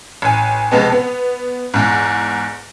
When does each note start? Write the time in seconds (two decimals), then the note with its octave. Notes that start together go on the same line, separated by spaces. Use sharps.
0.22 A1 G#5
0.71 F1 B2 G#3 B3 A5
0.92 B3
1.74 E2 G#2